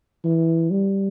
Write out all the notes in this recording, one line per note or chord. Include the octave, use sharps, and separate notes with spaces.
E3
G3